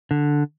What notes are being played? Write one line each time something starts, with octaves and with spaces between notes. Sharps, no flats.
D3